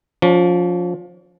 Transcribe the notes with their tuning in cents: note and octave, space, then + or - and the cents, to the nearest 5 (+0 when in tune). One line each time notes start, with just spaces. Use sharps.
F3 +20 C#4 +45